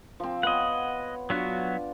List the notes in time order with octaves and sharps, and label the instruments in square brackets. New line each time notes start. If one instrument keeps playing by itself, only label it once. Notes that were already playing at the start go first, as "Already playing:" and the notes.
[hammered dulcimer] F3 C4
[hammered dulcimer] B3 C#5 [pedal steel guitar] D#5 F#5
[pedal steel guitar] F#3 B3 F#4 [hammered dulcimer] D4 F4